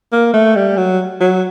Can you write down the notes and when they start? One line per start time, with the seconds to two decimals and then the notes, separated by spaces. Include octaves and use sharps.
0.13 A#3
0.34 A3
0.56 G3
0.77 F#3
1.21 F#3